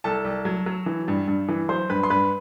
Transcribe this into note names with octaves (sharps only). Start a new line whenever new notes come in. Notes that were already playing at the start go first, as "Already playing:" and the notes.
C2 A4 A5
C2
F#3
F#3
E3
G2
G2
E3
F#3 C5 C6
G2 B4 B5
C6
G2 B4 B5